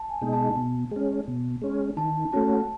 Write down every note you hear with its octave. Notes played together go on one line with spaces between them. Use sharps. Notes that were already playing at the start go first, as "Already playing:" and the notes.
Already playing: A5
G#5
B2 G#3 D#4
A5
B2
G#3 C#4
B2
G#3 C#4
D#3 A5
A3 C#4 F#4 A5